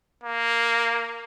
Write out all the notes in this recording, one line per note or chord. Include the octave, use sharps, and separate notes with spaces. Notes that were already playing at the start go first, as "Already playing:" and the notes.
A#3